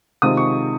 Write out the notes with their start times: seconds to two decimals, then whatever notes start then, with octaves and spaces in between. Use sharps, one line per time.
0.22 C3 D#3 G#3 C4 F4 D#6
0.37 C#6